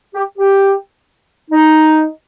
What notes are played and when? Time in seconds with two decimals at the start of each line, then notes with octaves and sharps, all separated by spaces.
0.14 G4
0.38 G4
1.51 D#4